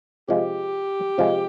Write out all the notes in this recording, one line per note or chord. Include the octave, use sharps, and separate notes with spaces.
C3 F3 G#3 G4
C3 F3 G#3